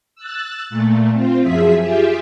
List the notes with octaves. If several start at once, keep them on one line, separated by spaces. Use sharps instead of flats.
E6 F#6 A6
A#2 A3
C4 F4
F#2 F3 G#4 E5 B6
F4 G4 G#4 E5